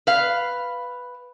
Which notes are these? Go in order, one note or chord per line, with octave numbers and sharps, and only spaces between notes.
B4 F5